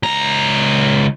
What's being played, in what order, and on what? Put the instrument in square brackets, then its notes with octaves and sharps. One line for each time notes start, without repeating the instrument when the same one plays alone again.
[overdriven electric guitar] C#2 A#5